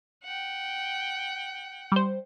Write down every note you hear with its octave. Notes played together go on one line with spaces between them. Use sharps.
F#5 G5
G3 C5